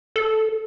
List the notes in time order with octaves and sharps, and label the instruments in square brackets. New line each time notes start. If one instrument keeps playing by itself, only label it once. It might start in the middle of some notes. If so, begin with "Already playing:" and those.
[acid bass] A4